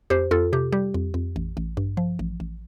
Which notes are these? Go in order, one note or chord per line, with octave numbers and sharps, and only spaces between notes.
F2 G4 C5
F2 F4 A4
C3 G4
G3 G4
F2
F2
A1
A1
G2
F3
A1
A1